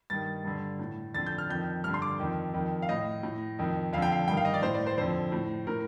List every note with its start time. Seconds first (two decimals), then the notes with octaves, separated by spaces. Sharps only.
0.10 G2 D#3 A6
0.44 G2 D3
0.79 A2
1.14 F2 D3 A6
1.26 G6
1.38 F6
1.49 F2 D#3 G6
1.84 G2 D3 F6
1.94 C6
2.02 D6
2.19 F2 D#3
2.54 F2 D#3
2.82 F5
2.89 A2 D#5
3.23 A2
3.59 F2 D#3
3.93 F2 D3 F5
4.02 G5
4.12 F5
4.28 G2 D#3 G5
4.37 F5
4.45 D#5
4.54 D5
4.62 A2 C5
4.74 D5
4.87 C5
4.98 F2 D3 C5
5.32 A2
5.67 A2 A#4